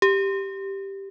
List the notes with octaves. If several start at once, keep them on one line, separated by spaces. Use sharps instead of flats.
G4